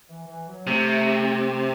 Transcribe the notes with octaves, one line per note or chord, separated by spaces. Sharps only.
E3
E3
F#3
C3 A3
A3